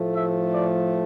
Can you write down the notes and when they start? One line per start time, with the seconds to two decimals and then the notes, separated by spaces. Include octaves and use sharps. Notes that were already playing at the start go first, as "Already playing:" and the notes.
Already playing: A2 F3 A3
0.13 E5
0.51 D5